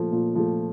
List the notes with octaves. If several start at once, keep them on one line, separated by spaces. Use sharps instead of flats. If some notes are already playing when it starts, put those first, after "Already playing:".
Already playing: A#2 F3 A3
A#2
F3 A3